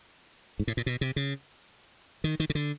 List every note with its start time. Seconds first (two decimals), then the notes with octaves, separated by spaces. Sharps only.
0.59 G#2
0.68 A2
0.77 A#2
0.86 B2
1.01 C3
1.16 C#3
2.24 D#3
2.40 D#3
2.50 C#3
2.55 D3